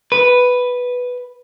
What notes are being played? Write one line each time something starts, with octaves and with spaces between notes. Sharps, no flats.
B4